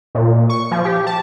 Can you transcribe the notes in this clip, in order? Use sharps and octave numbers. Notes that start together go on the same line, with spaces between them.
A#2
C#6
F3
G4
A5